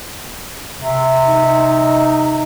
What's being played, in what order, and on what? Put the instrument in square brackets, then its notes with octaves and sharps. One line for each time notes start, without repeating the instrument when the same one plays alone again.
[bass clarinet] C3
[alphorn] D#4